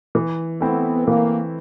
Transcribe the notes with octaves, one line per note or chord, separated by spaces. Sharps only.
E3
A3 B3 C4 E4
E3 A#3